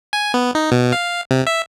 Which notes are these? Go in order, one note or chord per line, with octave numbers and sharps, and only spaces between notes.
G#5
B3
D#4
B2
F5
C3
E5